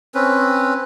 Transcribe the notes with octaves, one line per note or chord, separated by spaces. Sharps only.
C4 C#4 B4